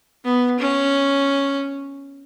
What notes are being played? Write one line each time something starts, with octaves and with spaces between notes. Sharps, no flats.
B3
C#4